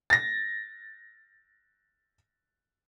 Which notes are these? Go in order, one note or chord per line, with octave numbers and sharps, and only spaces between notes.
A6 A#6